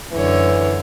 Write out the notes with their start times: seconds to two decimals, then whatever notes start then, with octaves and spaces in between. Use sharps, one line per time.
0.12 F#2 D3 E3 C#5